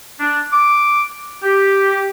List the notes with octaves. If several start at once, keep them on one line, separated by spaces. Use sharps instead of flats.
D4
D6
G4